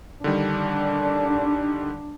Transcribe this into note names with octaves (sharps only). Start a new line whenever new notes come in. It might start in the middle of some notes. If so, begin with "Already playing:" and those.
D3 D#3 G3 D4